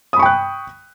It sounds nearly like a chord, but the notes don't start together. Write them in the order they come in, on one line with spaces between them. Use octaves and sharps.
D#6 B5 C#6 G5 F#6